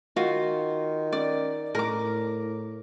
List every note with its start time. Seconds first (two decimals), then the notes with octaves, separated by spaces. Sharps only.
0.16 D#3 F4 F#4
1.13 C#4 D5
1.75 A2 A#4 D6